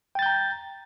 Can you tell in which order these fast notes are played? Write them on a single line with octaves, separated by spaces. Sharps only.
G5 A6 G6 A#5